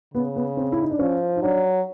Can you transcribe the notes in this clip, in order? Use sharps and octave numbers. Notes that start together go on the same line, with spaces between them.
C#3 B3
B3
C4
E4
D#4
D4
F3 C#4
D#4
F#3 D4